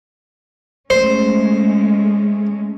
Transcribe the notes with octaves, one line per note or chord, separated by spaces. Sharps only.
G#3 A3 C#4 C5